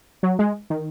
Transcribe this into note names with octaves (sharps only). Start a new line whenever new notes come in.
F#3
G#3
D#3